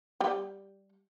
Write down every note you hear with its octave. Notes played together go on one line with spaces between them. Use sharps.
G3 G4